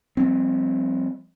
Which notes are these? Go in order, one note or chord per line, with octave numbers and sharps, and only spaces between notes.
F3 G3 C4